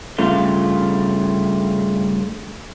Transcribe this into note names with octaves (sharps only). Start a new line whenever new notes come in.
G2 C#3 A3 F4